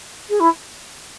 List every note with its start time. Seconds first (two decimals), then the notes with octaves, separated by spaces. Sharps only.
0.30 G#4
0.40 E4